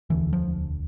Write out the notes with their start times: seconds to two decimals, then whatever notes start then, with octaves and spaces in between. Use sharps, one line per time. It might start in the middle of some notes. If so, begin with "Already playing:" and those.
0.10 E1 D2 D3 E3
0.33 F3